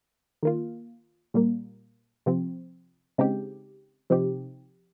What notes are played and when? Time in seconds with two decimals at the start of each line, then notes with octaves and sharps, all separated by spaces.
0.43 D#3 A#3 F4
1.34 A#2 G3 A#3
2.26 C3 F3 C4
3.18 C#3 G#3 C4 D#4 G4
4.10 C3 F3 C4 D#4 G4